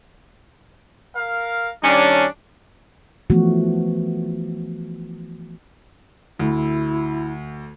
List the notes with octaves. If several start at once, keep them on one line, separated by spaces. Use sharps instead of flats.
A#4 F5
D#3 G3 C#4 D4
E3 F3 A3 B3 F#4
D2 E4